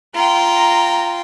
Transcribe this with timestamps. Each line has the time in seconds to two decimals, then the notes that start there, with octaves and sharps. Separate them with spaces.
0.15 F4 G5 A#5